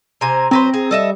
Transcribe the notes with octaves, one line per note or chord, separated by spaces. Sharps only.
C3 C5 G#5 A#5
F#3 C4 B4 C5 A#5
G#4
G3 A4 D#5 E5